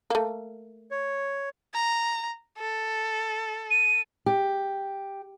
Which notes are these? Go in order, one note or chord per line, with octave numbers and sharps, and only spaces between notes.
A3 A#3
C#5
A#5
A4
D#7
G4